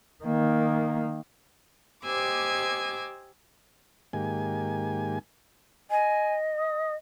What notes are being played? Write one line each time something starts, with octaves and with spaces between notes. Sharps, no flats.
D#3 A#3
G4 C5 D#5 G#5 D6 E6
G#2 D#3 A#3 G4 G#5
D#5 G#5
D#6